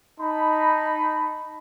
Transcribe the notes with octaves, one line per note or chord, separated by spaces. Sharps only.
D#4 A5 B5